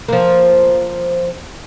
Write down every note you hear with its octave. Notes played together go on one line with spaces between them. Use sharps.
F3 A#3